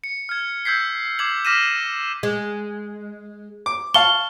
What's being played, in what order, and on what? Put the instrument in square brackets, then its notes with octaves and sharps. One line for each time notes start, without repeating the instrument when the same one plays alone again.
[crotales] C#7
F6 G#6
E6 G6 G#6 B6 C7
D6 G#6 C7 F#7
D6 F6 A#6 B6 D#7 E7
[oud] G#3
[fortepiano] D6
[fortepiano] F5 A5 C#6 [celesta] G7